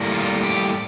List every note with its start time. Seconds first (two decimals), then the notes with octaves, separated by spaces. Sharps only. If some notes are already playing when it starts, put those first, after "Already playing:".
Already playing: A2 G3 A#3
0.12 F4
0.44 G4